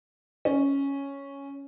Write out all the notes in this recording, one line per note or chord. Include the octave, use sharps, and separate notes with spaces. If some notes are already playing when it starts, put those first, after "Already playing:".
C#4